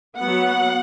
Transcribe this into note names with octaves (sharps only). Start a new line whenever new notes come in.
F#3 B3 F#5